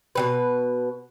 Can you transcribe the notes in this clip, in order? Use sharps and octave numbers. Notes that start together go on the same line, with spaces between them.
B2 E3 B4